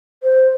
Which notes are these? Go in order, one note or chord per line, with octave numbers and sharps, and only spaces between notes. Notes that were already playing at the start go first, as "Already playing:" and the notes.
C5